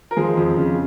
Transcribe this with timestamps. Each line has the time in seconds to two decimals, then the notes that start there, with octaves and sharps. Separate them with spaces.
0.11 A#4
0.16 F3 G#3 G#4
0.37 F2
0.57 C#3